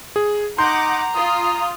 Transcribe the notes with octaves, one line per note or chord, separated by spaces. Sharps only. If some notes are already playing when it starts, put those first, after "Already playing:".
G#4
D#4 F#5 A#5 C6 D6 G6
F4 D#6